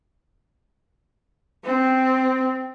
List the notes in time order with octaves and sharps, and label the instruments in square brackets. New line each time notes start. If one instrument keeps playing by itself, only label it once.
[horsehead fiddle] C4